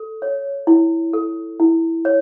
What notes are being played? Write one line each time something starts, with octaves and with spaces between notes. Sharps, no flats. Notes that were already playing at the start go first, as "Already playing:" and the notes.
Already playing: A4
C#5
E4
A4
E4
C#5